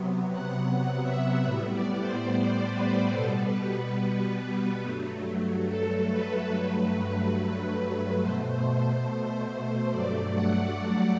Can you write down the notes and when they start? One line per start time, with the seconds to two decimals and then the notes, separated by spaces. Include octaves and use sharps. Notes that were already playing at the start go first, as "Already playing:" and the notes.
Already playing: C3 F#3 B3
0.32 F#5
0.60 F#5
1.02 E5
1.44 A2 G3 B3 E5
1.73 D5
2.00 C5
2.71 B4
3.13 B2 G3 B3 A4
3.42 B4
3.70 B4
4.83 G2 F#3 A3
5.68 A4
6.10 B4
6.53 G2 F#3 A3
8.22 B2 A3 C5
8.50 C5
8.78 C5
9.91 G2 F#3 A3 D5
10.34 F#5
10.76 F#5